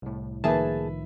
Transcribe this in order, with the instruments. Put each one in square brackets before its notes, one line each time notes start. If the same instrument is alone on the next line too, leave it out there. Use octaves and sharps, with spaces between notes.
[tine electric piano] C2 A2
[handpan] D#3 F3 [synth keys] A#3 G#4 A5 [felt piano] B4 E5